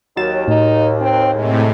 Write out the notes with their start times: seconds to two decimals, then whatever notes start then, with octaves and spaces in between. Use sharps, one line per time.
0.17 D#2 F#3 F#4 A6 E7
0.48 A2 D#4
1.01 C4
1.35 A2 C3 G#3